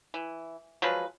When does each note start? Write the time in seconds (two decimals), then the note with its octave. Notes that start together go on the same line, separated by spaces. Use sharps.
0.14 E3
0.82 F3 F#3 G#3 B4